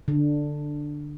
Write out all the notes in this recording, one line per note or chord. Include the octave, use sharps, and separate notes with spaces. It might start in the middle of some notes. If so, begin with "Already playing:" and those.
D3